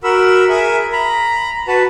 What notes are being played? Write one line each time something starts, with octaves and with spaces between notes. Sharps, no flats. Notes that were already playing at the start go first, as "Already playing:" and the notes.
F#4 A#4 B5 E6
G#4 A#4 E5
A#5 B5
F#4 B4 A5